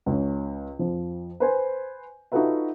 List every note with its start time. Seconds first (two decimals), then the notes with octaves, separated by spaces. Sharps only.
0.06 C#2 C#4
0.79 F2 F3
1.40 B4 C5 G#5
2.32 D#4 F4 F#4 A4 B4 E5